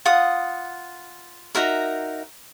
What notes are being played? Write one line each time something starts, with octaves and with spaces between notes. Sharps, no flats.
F4 F#5 D#6
D#4 F#4 A#4 E5